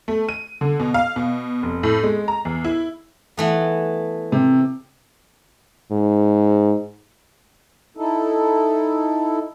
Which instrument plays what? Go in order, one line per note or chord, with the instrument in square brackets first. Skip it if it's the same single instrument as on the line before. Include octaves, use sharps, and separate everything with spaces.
[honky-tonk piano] A3
D#7
D3
B2
F5
B2
F1
A2
G#3
A#5
E2
E4
[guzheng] E3 A3 B3
[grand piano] C3
[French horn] G#2
[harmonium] D#4 E4 A4